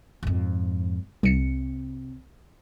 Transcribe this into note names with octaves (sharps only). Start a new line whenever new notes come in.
F2 G#2
C2 C3 C#7